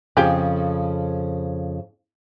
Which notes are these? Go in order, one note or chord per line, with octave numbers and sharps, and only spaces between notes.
F2 C#3 F4 G4 G#4